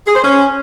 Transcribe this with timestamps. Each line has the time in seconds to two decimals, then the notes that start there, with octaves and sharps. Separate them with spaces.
0.07 G#4
0.15 C5
0.24 C#4